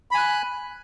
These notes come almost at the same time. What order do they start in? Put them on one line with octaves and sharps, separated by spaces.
B5 G#5 F#6